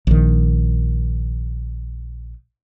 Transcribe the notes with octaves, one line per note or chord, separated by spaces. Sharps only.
A#1 D#3